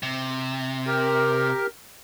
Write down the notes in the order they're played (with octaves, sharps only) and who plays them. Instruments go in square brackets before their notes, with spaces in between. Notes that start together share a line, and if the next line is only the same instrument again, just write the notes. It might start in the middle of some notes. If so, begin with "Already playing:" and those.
[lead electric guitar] C3
[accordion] G4 A#4